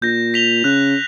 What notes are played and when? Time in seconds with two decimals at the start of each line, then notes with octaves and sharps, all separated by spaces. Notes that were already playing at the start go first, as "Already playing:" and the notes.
0.02 A#2 G6 A#6
0.34 B6 F7 G7
0.64 C#3 F#6